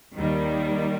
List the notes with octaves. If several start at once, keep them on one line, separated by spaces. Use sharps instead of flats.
D#2 D#3 G3